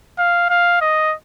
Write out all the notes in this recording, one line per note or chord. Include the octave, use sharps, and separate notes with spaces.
F5
F5
D#5